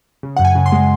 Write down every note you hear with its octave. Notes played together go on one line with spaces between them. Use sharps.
C#3
F#2 F#5
G#5
C#3
C6
G#3